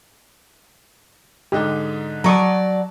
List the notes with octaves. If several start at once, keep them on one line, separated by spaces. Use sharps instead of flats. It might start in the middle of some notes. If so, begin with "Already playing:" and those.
G#2 D3 D#4 G4
F#3 D5 A5 A#5 C#6 D#6